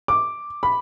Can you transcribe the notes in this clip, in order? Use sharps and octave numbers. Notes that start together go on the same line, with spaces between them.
D6
B5